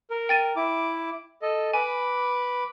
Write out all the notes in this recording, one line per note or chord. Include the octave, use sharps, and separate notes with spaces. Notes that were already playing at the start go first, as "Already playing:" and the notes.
A#4
G5 A6 D#7
E4 D6
A4 D#5
B4 G#5 B5 D6